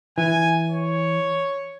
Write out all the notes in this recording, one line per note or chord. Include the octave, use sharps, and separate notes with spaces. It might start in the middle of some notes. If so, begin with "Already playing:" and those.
E3 G#5
C#5